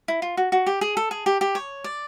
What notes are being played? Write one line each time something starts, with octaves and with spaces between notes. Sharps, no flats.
E4
F4
F#4
F#4
G4
G#4
A4
G#4
G4
G4
C#5
D5